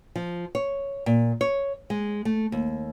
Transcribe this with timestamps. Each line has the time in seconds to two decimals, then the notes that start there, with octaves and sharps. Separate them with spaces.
0.16 F3
0.55 C#5
1.06 A#2
1.41 C#5
1.90 G#3
2.25 A3
2.52 D#2